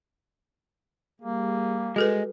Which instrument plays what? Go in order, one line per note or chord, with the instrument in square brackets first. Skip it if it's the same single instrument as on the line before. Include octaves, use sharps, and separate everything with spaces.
[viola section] G3 G#4 [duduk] A#3
[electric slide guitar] G#3 [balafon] F#4 A4 B4